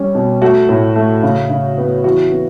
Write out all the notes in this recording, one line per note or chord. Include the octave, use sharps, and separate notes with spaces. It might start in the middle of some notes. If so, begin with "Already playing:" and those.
Already playing: G3 C#4
B2
A3 F#4
A2
A3
C#3
C#3
B3
E3 F#4
B3